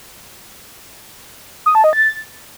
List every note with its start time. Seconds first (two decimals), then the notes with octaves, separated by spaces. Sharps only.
1.66 D#6
1.75 A5
1.84 D#5
1.93 A6